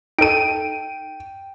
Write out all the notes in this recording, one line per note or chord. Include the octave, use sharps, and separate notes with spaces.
D#4 A4 G5 D7 D#7